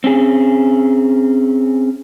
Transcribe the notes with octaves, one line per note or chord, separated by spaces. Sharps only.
C4 C#4 G#4